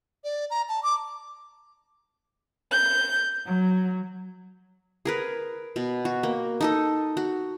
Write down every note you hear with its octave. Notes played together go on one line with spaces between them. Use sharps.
D5
A#5
A5
D6
G6
F#3
G#4 A#4 B4
B2
F#4
A#3
D#4 A4 D#5
F#4